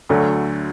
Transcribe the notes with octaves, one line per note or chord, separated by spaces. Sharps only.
D2 D3 F#3 A3